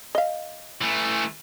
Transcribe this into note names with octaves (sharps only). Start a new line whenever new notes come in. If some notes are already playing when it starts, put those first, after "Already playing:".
D#5 F5
E3 A3